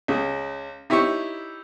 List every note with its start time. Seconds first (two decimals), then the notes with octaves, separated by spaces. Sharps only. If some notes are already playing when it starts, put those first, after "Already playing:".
0.08 C#2 C#3
0.90 D#4 E4 G4 C#5 C#6